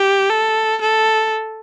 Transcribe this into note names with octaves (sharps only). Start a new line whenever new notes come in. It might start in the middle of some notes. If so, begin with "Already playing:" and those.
Already playing: G4
A4
A4